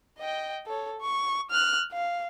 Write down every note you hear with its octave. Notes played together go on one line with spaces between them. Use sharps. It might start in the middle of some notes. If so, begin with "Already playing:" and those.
D#5 G5
A4 C#5
C#6
F6 F#6
F5